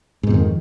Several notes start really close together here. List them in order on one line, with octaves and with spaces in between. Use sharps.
G#2 B2 F2 D#3